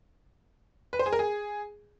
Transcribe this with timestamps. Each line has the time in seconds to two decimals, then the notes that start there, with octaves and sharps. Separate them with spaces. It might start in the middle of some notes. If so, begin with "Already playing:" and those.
0.93 B4
0.99 C5
1.06 G#4
1.13 A#4
1.19 G#4